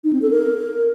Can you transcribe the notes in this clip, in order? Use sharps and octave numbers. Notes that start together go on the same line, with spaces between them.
D#4
C4
A4
A#4